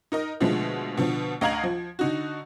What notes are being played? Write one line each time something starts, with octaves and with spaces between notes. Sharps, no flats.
D#4 A#4 D#5
B2 D3 F3 G#3 A3
B2 D3 F3
D2 D#5 F5 A#5 G#6 F#7
F3
D3 D#4 F#4